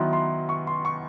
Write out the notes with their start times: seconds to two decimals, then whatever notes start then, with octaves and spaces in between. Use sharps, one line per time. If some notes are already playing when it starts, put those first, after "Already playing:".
Already playing: D#3 F#3 B3 E4 C6
0.13 C6
0.49 C#6
0.67 C6
0.85 C#6